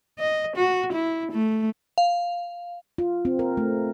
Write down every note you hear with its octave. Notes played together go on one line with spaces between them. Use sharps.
D#5
F#4
E4
A3
F5
F4
C4
A#4
A3